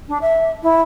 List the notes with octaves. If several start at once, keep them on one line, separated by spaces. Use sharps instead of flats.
D4
E5
E4